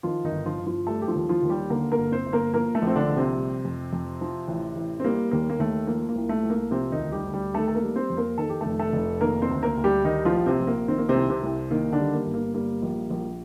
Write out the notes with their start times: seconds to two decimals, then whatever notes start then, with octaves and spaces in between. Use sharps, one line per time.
0.03 D#3 F3 F4
0.25 D#3 D#4
0.32 G1
0.45 F3 F4
0.59 G1
0.66 F3 F4
0.87 G3 A3 A4
1.02 G4
1.08 F3 F4
1.15 D#2
1.29 F3 F4
1.43 D#2
1.49 G3 G4
1.70 D3 A#3 A#4
1.92 A#3 A#4
1.98 G1
2.12 C4 C5
2.26 G1
2.33 A#3 A#4
2.53 F3 A#3 A#4
2.75 A3 A4
2.82 A#1
2.87 C4
2.96 D3 D4
3.09 A#1
3.16 C3 C4
3.37 G3
3.65 F2
3.93 F2
4.21 F3
4.48 A1
4.76 A1
5.00 C4
5.04 G3 A#3
5.31 D#2 A#3
5.50 A#3
5.59 D#2 A3
5.87 F3 A#3
6.09 A#3
6.15 C2
6.29 A3
6.43 C2
6.50 A#3
6.71 C3 F3 C4
6.92 D#3 D#4
6.98 D2
7.12 G3 G4
7.26 D2
7.34 G3 G4
7.54 D#3 A3 A4
7.68 A4
7.75 A#3 A#4
7.82 G3
7.96 C4 C5
8.10 F2
8.17 A#3 A#4
8.38 D#3 A4
8.50 G4
8.61 F1 A3 A4
8.79 A3 A4
8.93 F1
9.21 D#3 A#3 A#4
9.42 C4 C5
9.50 D2
9.63 A#3 A#4
9.77 D2
9.84 G3 G4
10.04 D#3 G3 D#4
10.25 F3 F4
10.32 A#1
10.46 C3 C4
10.60 A#1
10.67 A#3
10.88 D#3 C4
10.98 A#3
11.09 C3 C4
11.15 C2
11.30 C3 C4
11.43 C2
11.71 D#3 A#3
11.92 D3 D4
11.99 G3
12.13 A#3
12.27 G1
12.34 A#3
12.54 G3 A#3
12.82 A#1
13.10 A#1